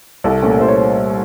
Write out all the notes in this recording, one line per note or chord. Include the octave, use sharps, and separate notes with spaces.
C2 A4
A#2 A3 C#4
C2 C5
C#5
C5